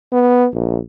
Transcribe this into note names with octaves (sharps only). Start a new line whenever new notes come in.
B3
A#1